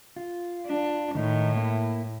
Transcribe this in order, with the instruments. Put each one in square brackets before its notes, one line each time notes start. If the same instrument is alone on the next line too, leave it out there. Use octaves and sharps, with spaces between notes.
[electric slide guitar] F4
[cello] D4
[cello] A2 [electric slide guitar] D#3 D#4
[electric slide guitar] A#3 E4